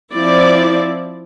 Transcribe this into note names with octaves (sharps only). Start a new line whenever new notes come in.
F3 C4 E4 D5